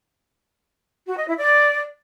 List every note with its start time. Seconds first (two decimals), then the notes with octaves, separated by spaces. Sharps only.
1.07 F#4
1.17 D#5
1.27 E4
1.37 D5